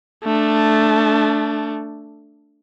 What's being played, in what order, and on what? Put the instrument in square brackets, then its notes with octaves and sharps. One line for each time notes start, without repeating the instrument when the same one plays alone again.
[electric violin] A3 D4